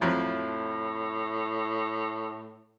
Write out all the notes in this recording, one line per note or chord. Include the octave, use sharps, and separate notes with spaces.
F2 A2 F3 F#3